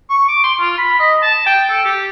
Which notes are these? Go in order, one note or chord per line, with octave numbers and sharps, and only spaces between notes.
C#6
D6
C6
F4
B5
D#5
A5
G5
A4
G4